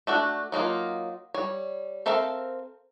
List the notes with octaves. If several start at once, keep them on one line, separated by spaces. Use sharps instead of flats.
A3 D4 F#4
F#3 A#3 D#4 F4
G3 C#5
C4 A4 A#4 E5 F5